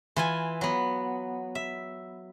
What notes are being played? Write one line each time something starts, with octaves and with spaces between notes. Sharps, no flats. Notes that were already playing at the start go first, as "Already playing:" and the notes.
E3 F4 G#5
F#3 B3
E5